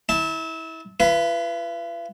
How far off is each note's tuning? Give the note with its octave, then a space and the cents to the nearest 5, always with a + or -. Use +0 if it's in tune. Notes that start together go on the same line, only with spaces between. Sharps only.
E4 -30 A5 +0
F4 -45 B4 +0